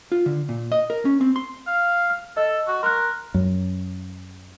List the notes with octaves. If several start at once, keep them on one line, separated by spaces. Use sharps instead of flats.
F4
D3
A#2
D#5
A#4
C#4
C4
C6
F5
F6
A4 D#5
F#4
A#4 C6 F#6
F#2